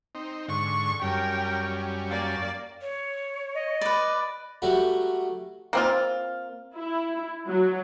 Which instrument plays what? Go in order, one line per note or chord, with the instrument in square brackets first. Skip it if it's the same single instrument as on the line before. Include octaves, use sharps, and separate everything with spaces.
[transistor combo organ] C4 D#4
[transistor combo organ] G#2 D3 [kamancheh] C#6
[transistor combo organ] F#2 G3 C#4 [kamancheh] A#4 G5
[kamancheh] A#3 D5
[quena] C#5
[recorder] D#5
[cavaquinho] B4 D5 [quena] B5
[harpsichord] F#3 G3 A3 F#4
[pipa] A#3 C4 F4
[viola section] E4
F#3